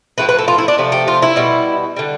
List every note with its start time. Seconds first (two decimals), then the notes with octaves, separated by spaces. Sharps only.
0.18 A2 F3 A3 B4
0.29 B4
0.39 A4
0.48 F4
0.58 E4
0.68 D4
0.78 C3 F3 A3
0.92 G4
1.08 F4
1.22 E4
1.36 B2 G3
1.96 D3 G3